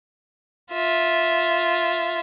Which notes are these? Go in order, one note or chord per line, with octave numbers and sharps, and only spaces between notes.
F4 E5